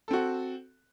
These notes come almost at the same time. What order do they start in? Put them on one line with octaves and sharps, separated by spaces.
A4 C4 F#4